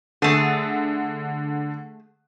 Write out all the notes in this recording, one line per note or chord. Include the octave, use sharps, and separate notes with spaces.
D3 A3 G#4